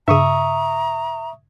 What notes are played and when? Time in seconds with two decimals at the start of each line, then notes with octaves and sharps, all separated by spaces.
0.08 G2 C#3 E5 A#5 C#6 D#6